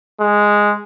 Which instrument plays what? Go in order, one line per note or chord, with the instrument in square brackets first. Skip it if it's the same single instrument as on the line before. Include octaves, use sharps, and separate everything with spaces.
[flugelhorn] G#3